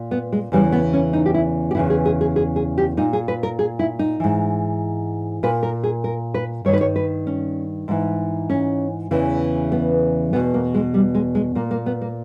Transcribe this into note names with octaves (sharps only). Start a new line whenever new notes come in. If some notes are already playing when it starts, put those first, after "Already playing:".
Already playing: A#2
B3
G#3
E2 C#3 E3 G3
B3
C#4
D#4
G4
E4
G4
E2 C#3 E3 E4
G#4
G#4
G#4
G#4
G#4
G4
A#2 D#4
G#4
B4
A#4
G#4
E4
D#4
G#2 E3
A#2 B4
A#4
G#4
A#4
B4
G2 D#3 C#5
B4
C#5
B4
C#4
G#2 E3
C#4
E2 C#3 E3
B3
E2 B2 B3
A#3
G#3
G3
G#3
G#3
A#2 A#3
A#3
B3
A#3